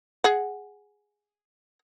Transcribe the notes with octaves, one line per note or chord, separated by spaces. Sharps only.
G#4 F#5